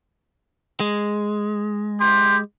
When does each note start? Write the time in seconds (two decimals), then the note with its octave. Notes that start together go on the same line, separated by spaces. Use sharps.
0.80 G#3
2.00 G4 C6